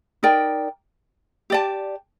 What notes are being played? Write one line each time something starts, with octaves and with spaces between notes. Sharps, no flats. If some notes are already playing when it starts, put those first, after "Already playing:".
D#4 A#4 D5 G5
G4 D5 A5